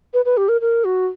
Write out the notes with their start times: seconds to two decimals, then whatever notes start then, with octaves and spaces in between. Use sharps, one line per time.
0.14 B4
0.25 B4
0.37 G4
0.49 A#4
0.61 A#4
0.85 F#4